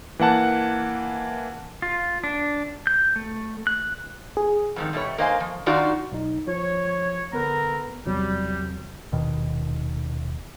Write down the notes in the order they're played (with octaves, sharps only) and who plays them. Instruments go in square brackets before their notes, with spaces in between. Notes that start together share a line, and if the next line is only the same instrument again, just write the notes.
[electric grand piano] E3 A#3 F#5 A5 F#6
[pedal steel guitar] F4
D4
G6
A3
F#6
[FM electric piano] G#4
[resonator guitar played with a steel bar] F2 G#2 D#3
B2 G3 A3 C#5
A#3 C5 D#5 F5 F#5 G#5
F3
D#3 D4 D#4 F4 F#4 D5
[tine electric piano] B1 D#4
[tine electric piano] F3 [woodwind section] C#5
[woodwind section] D3 A#4 A#5 [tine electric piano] B3 B4
[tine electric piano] E2 C3 F#3 [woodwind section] G3
[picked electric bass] D#1 B2 D#3